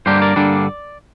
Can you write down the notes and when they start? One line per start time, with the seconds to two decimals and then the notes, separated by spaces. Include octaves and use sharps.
0.06 G2 D3 G3 A#3 D4 G4 C5
0.22 A#4 D5
0.36 G2 D3 G3 A#3 D4